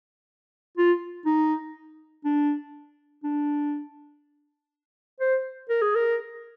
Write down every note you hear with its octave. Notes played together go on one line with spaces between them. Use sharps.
F4
D#4
D4
D4
C5
A#4
G#4
A#4